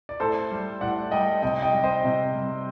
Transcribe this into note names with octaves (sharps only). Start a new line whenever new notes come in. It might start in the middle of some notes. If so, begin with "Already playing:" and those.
D5
A2 A4 C5
G3
A2 D5 F#5
G3 D#5 G5
C3 D#5 G5
D#5 G5
G3
C5 D#5
C3
G3